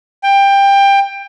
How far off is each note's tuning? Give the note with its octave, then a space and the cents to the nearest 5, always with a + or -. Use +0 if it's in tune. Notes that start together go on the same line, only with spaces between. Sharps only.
G5 +20